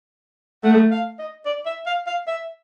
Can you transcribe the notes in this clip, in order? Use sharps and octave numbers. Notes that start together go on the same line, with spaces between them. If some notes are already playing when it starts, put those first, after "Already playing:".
A3 F#5
F5
D#5
D5
E5
F5
F5
E5